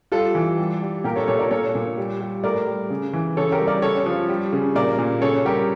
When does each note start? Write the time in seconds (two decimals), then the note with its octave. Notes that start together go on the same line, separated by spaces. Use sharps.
0.12 G3 F4 A4
0.35 E3
0.58 G3
0.82 G3
1.04 A#2 G4 A#4
1.16 A4 C#5
1.28 A#2 A4 C#5
1.39 A#4 D5
1.51 A#2 A4 C#5
1.75 A#2
1.97 G3
2.21 G3
2.43 A2 A#4 D5
2.67 G3
2.90 C#3
3.13 E3
3.37 C#3 A4 C#5
3.52 G4 A#4
3.59 G3
3.67 A#4 D5
3.82 C#3 A4 C#5
4.06 F3
4.29 G3
4.53 C#3
4.75 A#2 A#4 D5
4.99 A#2
5.22 C#3 A4 C#5
5.45 G3 G4 A#4